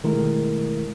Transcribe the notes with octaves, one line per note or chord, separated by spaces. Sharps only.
B2 D#3 G#3 A3 E4 A#4